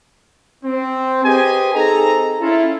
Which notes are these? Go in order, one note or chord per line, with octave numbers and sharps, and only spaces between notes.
C4
G4 G#4 B4 C5 D#5 G#5
C4 D#4 G#4 A4 A#5
C#4 E4 F4 A4